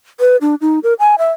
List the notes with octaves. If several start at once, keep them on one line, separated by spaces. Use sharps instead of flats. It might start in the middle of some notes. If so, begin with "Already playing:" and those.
B4
D4
D#4
A#4
G#5
E5